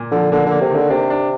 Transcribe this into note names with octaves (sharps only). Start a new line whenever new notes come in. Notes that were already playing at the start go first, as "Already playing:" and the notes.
Already playing: A#2
D3 F3
D3 A#3
D3 A#3
C3
D3 D#3
C3 D4
D4